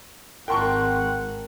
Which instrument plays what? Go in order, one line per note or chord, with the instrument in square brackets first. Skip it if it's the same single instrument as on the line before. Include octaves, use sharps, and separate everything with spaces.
[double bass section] G#1 [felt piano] A#4 A5 [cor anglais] F#5 [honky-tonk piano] G5 C6 C#6